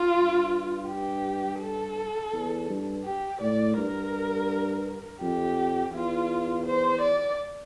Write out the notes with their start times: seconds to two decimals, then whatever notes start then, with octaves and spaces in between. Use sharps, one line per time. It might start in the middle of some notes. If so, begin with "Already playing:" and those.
Already playing: F4
0.17 G2
0.88 G4
1.61 A4
2.33 E2
2.69 G2
3.05 G4
3.41 A2 D5
3.77 G2 A#4
5.21 F2 G4
5.93 E2 F4
6.66 C5
7.01 D5